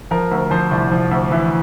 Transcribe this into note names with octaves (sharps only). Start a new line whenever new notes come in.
F3 A#4
D2
F3 C5
C2 C5
F3
D2
E3